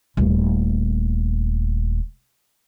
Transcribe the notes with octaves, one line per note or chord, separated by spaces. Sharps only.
D#1 A3